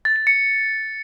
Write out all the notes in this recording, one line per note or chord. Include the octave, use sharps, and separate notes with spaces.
A6
A6
C#7